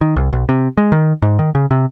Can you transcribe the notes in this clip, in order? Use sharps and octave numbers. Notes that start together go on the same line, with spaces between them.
D#3
C2
B1
C3
G#3
D#3
G#2
D#3
C#3
C3